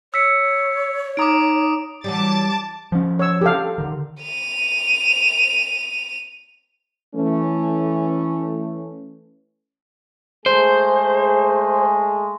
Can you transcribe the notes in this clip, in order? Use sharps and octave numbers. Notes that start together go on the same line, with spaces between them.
C#5 E6 B6 C#7
D#4 A#5 D6 D#6 D7
E3 F#3 G3 A5 D6 A6
F3 C#4
C#5 E6
G4 A4 F5
D3 D#3
D#7 F7
E3 A3 C#4
G#3 A3 G#4 C5